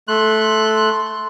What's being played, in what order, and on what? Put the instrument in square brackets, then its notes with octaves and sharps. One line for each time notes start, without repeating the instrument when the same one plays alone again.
[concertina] A3 F#6 [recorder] C6